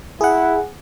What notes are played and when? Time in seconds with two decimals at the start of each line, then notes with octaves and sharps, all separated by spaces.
0.21 E4 G#4 F#5